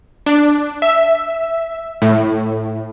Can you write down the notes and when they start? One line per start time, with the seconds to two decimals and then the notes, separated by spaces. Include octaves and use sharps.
0.26 D4
0.82 E5
2.02 A2